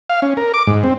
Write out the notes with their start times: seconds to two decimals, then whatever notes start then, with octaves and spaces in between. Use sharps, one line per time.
0.10 F5
0.22 C#4
0.37 A#4
0.54 D6
0.67 G#2
0.84 C4